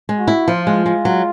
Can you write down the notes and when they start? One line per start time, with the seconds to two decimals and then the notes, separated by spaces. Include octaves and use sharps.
0.09 G#3
0.19 F#4
0.28 E4
0.48 F3 F4
0.67 G#3
0.86 G#3
1.05 F#3